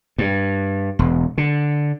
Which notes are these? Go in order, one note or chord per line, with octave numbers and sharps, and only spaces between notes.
G2
E1
D3